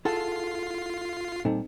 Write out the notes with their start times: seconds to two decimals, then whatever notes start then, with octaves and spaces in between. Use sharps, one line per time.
0.05 E4 F4 G#4 A4 F#5 C7
1.45 A#2 G3 C4 D#4 A4